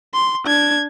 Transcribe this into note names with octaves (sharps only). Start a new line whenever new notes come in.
C6
D4 G#6